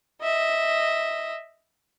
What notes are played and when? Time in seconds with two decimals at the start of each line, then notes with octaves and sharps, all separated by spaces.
0.22 D#5 E5